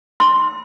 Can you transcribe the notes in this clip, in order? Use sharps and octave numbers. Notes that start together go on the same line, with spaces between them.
C6